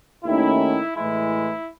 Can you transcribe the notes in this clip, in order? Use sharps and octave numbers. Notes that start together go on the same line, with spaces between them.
D#2 D#3 A3 C#4 E4
A2 E3 G#3 E4